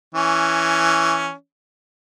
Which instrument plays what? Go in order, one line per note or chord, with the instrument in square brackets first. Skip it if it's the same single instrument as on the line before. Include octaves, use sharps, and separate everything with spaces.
[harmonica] E3 C#4